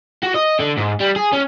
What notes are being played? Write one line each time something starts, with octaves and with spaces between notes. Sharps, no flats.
F#4
D#5
D3
G#2
G3
G#4
C#4